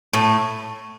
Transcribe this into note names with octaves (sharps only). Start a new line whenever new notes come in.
A2 A3